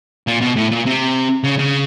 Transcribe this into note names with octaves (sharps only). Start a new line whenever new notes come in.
A#2
B2
A2
A#2
C3
C#3
C#3